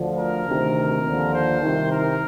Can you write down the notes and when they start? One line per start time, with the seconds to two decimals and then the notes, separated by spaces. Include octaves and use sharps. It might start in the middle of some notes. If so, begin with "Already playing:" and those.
Already playing: D2 D3 F3
0.16 A#4
0.46 D2 C3 D#3
1.04 D#2 D3 F3
1.33 C5
1.62 C2 C3 D#3
1.91 A#4